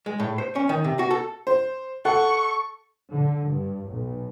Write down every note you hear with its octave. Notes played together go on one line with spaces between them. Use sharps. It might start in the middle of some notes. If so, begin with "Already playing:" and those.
G#3
A2
C5
C#4
D#3
C3
F#4
A4
C5
A4 F#5 C#6
D3
G2
B1